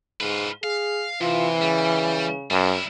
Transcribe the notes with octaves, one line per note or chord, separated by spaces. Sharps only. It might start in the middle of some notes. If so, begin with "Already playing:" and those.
G#2 F4 B4
G#4 F5
C3 E3 F4
C#3 G3
F#2 G3 E4